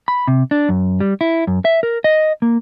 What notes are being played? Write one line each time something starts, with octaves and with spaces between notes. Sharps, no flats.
B5
C3
D4
F#2
G3
E4
F#2
E5
A#4
D#5
A#3